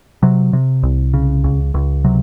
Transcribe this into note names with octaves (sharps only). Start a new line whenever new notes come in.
C3 F#3
C3
C2
C#3
C#2
C#2
C3 F#3